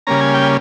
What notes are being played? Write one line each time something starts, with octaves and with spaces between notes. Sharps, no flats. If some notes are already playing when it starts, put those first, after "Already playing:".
C#3 G3 A#3 C#4 A#5
G#5
G5